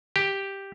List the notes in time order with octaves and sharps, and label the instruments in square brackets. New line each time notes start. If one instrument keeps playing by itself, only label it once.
[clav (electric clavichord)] G4